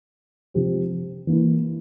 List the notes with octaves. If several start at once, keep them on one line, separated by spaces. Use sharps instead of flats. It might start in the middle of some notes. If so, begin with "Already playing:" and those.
C3 F3 C4 G4
E3 A#3 E4